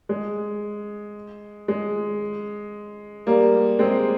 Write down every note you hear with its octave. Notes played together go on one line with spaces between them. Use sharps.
G#3
G#3
G3 A#3
G#3 C4